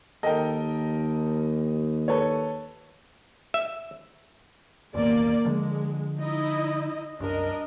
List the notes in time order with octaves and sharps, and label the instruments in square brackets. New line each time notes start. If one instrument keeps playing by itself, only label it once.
[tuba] D#2 [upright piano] A4 A#4 G5 [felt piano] D#5
[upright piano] A4 B4 C#5
[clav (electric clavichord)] E5
[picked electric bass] A1 D#2 B2 [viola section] A#3 D5
[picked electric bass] D3 F3 [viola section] G#3
[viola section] D#4 E4 D#5
[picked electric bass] C2 F#2 [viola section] D4 A#4 D#5